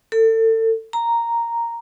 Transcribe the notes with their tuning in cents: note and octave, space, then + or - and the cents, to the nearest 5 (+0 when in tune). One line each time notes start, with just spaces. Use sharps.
A4 +30
A#5 -5